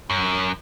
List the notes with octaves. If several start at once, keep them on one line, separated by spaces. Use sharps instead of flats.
F#2